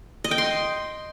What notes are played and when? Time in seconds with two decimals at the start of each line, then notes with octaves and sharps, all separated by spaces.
0.24 D#5
0.31 G5
0.38 C6